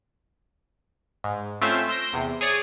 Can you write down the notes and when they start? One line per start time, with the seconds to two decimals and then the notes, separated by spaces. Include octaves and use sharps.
1.24 G#2
1.61 A3 C4 C#4 F4 C5 E5
1.88 C6 E6 G6 A#6 D7
2.13 E2 C3
2.41 G#4 C#5 D5 D#6